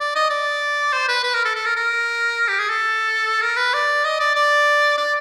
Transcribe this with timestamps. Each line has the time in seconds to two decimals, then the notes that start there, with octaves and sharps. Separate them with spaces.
0.01 D5
0.16 D#5
0.30 D5
0.93 C5
1.09 B4
1.24 B4
1.35 A#4
1.45 A4
1.55 A4
1.66 A#4
1.76 A#4
2.48 G4
2.59 G#4
2.70 A4
3.42 A#4
3.57 B4
3.74 D5
4.05 D#5
4.20 D5
4.35 D5
4.98 D5